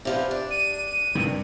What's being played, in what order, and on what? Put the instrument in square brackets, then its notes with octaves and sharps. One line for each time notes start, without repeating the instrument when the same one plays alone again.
[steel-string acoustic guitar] C3 F3 B3
D4
[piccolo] D#7
[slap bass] G2 C3 D#3